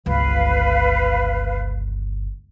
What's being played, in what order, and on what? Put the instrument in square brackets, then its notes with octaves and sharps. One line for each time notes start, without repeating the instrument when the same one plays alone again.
[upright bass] G1 C#2 [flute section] B4 F5